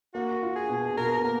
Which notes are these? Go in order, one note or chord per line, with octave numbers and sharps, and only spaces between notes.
A#3 F#4
F4
G#4
B2
B2 A#4
A#3 A#4